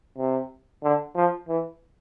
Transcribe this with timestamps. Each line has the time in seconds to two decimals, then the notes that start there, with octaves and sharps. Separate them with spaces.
0.18 C3
0.84 D3
1.16 F3
1.49 E3